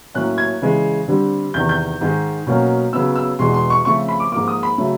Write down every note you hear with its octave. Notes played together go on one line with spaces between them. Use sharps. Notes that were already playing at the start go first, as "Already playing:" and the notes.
A2 F#3 A#3 C#4 F#6
G#6
C#3 E3 G#3
D3 G3 C4
E2 C3 D#3 G6
G6
G#2 D#3 G#3
B2 F#3 A#3 C#4
C#3 F#3 B3 E6
E6
E2 B2 G#3 C6
C6
C#6
C#3 F3 A3 C4 C#6
B5
D6
G#2 F3 A#3 D6
D#6
B5
C#3 F#3 A3